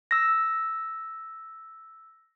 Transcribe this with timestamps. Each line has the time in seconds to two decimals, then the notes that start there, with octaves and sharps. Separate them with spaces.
0.11 E6 A#6